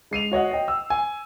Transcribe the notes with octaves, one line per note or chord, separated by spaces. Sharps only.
G#3 C7 D#7 F7
F#4 C#5 D#5 F#5
D#5 G5
E6
G#5